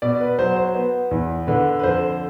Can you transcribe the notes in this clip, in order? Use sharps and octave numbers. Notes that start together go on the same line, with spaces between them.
B2 D5
B4
F#3 C5
C5
B3
E2
D3 B4
B4
F2 C5